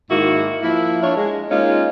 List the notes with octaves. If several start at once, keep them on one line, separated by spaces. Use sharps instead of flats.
G#2 D#3 A#3 E4 F#4
F3 A#3 E4
D4 F4 C#5
G#3
G#3 A#3 C#4 D#4 F4